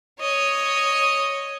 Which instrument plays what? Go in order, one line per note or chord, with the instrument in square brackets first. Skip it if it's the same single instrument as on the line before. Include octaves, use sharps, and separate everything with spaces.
[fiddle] C#5 [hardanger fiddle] D#5